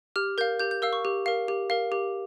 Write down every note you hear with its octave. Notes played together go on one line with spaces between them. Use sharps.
G4 F6
A#4 F5 G6
G4 G6
G6
A#4 F5 E6
C#6
G4
A#4 F5
G4
A#4 F5
G4